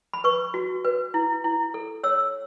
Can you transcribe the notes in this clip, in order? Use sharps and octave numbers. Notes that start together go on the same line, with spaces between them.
B5
B4 C#6
F#4
B4
E4
E4
A4
C#5 E6